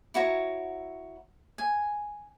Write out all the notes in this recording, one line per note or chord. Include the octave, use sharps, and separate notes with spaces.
E4 F#4 C#5 A#5
G#5